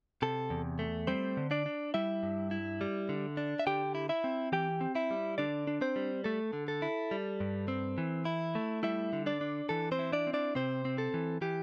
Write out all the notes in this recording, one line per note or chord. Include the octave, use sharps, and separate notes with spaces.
C3 A4
E2
A3
G3 C4 C5
D3
D4 D5
D4
G3 E4 E5
G2
E4
G3
D3
D4
E5
D3 G4 G5
E4
E4 E5
C4
E3 G4 G5
C4
E4 E5
G3
D3 D4 D5
D4
C4 C5
G3
A3 A4
D3
A4
E4
G3
G2
C4
E3
E4
A3
G3 E4 E5
D3
D4 D5
D4
E3 A4
C4 C5
E4
D4 D5
C4
D4 D5
C3 C4 C5
C4
A4
E3
E3 G4